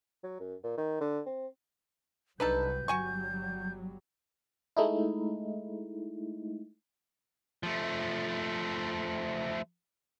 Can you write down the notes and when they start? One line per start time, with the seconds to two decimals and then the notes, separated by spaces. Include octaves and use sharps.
0.23 F#3
0.40 F#2
0.64 A#2
0.78 D#3
1.01 D3
1.26 C4
2.40 C2 C3 F#3 D4 D#4 A4 B4 G6
2.88 G1 F#3 G3 F#4 G#5 C#6
4.77 G#3 A3 D#4 E4
7.63 F3 A3